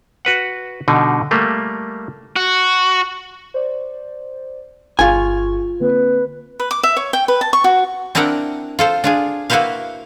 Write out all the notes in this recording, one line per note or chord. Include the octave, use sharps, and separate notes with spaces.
F#4 B4 F#5
B2 D3 G3 D#4
G3 A3 A#3
F#4
C5 D5
G1 F4 G#4 G#5 C#6
D3 A#3 C4 B4
B4
D6
E5
C#5
G5
B4
A5
C#6
F#4
C4 D4 E4 A#4 F#5 G5
F4 A4 C5
D4 F4 G#4
A#3 E4 F#4 B4 C5 F5